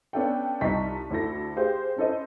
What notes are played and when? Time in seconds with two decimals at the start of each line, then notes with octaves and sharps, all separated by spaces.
0.13 B3 C#4 D4 A4 F5 G5
0.61 C2 D#4 F4 A5 C#6 B6
1.10 D2 E4 A4 A#6
1.56 G4 G#4 C5 F5
1.96 C#4 E4 A4 C5 D#5